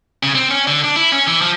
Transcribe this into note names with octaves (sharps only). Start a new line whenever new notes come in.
C#3
C4
C#4
D3
D4
E4
C#4
E3
F3